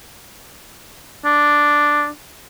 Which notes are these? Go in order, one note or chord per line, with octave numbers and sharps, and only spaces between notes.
D4